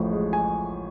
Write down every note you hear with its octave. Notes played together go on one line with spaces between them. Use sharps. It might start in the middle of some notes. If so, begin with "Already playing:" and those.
Already playing: A1 A2 F3
G#3
G#5